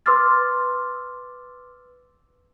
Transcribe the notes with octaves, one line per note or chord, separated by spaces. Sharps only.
B4 C6 D6 E6 F6 A6